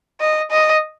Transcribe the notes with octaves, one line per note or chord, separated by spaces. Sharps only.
D#5
D#5